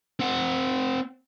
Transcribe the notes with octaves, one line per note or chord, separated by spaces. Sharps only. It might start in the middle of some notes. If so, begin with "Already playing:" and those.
C4 F#5